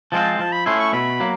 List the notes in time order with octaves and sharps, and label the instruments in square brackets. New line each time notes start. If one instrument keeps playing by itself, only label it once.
[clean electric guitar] F3 G#3 C4 F4 [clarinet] A5
[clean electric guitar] F3 [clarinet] A5
[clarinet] B5
[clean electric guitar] A3 C#4 E4 [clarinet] C6
[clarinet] C#6
[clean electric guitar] B2 [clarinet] B5
[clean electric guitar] F#3 A#3